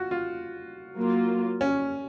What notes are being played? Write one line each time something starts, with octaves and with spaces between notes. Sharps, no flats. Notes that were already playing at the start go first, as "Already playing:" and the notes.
Already playing: F4 F#4
F4
F#3 A#3 F4
C#4